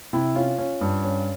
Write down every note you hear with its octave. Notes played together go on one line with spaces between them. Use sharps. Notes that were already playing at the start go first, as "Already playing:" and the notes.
C3 E4
C#4 F4
C#4
G2
C#4